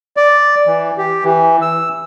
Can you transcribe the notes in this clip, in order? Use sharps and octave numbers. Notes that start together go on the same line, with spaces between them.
D5
E3
G4
E3
E6